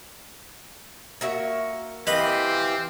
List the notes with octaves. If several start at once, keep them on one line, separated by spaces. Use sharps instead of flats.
A#3 F#4 E5
E3 C4 G4 B4 D#5 F5